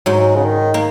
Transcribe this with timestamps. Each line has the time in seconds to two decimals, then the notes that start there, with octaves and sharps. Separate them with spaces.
0.06 G#2 F#3 G#3
0.36 C#3
0.45 D#3
0.74 A#3